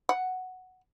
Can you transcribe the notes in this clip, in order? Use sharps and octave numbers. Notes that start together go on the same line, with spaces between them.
F#5